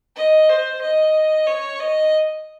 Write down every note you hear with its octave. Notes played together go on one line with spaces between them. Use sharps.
D#5
C5
D#5
C#5
D#5